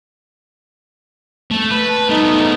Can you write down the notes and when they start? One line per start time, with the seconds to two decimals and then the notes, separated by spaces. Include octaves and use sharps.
1.51 A3
1.71 B4
1.89 A5
2.10 A3 B3 D#4